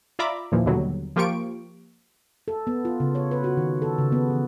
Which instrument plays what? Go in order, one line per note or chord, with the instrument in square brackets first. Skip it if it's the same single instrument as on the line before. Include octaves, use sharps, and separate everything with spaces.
[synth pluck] F4 D5 E5 A#5 B5 D6
D#2 A#2 E3 F3
D#2 B2 D3 F#3 G3
F3 A#3 F4 G4 C#6 D7
[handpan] A4
B3
F4
C#3
C#5
B4
F#4
D#3
A4
C#3
B3
E3